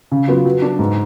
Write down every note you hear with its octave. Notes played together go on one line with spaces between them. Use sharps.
C#3
F#3 B3 F4
F#3
B3 D4
G#2